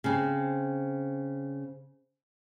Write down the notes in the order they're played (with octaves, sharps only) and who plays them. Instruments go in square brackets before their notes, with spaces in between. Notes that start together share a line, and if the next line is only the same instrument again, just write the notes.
[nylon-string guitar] C#3 C4